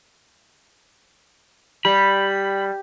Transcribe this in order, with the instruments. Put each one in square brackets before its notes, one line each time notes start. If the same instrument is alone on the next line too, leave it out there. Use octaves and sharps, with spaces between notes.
[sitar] G3 [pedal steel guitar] B5